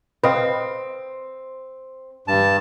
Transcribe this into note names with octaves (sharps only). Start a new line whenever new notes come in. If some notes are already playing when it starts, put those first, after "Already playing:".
C4 B4 D#5 F5
G2 A5